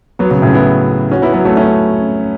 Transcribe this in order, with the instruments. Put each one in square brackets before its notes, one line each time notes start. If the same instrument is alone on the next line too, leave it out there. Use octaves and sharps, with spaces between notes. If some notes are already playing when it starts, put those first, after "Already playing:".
[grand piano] F#3 B3
C#3 F#3
A2 C#3
B3 E4
C#4 F#4
B3 E4
F#3 B3
A3 C#4
A3 C#4